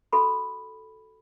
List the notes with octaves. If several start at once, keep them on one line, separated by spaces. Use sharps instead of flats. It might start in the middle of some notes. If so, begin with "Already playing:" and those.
F#4 A4 B5